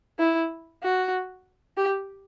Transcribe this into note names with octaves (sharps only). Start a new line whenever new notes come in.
E4
F#4
G4